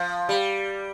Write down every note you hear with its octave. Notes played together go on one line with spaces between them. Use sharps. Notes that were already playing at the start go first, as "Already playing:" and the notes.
Already playing: F3
G3